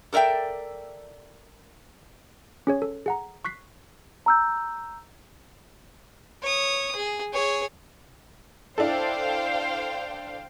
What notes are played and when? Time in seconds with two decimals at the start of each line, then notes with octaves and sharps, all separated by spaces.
0.13 A4 A#4 D5 E5 G5
2.67 C#4 G#4 C#5
2.82 A4
3.06 G#4 F#5 A#5
3.45 C#6 F#6 B6 C7
4.26 A#5 E6 G6
6.43 C#5 D#6
6.96 G#4
7.33 G#4 C#5
8.78 D4 E4 A4 C5 F5 G5